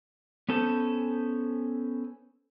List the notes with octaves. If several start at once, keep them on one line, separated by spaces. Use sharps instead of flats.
B3 C#4 A4 C5